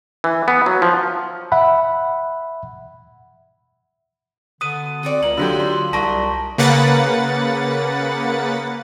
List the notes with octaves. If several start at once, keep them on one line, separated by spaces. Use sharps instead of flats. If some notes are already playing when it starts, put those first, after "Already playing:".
E3
B3
F#3
F3
E5 F#5 B5
D3 B3 F#4 D#6 D#7
C4 F#4 A4 D5
C#2 A#3 F#7
D3 F#3 F4 G4
B3 C6
C2 A#2 G4 G#5 A5 C#6 A#6
C#3 A#3 B4 F#5 A6